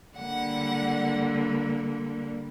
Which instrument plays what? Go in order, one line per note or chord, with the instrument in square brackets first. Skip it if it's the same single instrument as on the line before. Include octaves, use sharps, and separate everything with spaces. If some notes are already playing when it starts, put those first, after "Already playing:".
[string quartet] D3 G3 A#3 F#5